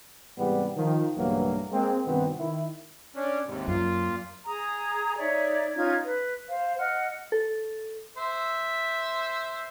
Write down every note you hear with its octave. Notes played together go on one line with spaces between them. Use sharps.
G#2 C3 E3 G3 B3
D#3 F3
B1 G2 C#3 E3 F#3 A#3
G#3 A#3 C4
G2 C3 D#3 B3 C4 F#4
D#3 E4
C#4 D4
D#2 G#2 C3
F#2 A#2 F4
G#4 A#5 D#6
D#4 C#5 D5 E5
C#4 D#4 F4 G#6
B4
C5 F5
D#5 F#5 F6
A4
C5 E5